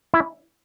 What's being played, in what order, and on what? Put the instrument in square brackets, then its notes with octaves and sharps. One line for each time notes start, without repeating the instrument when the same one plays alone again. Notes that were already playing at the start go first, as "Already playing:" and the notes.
[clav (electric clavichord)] E4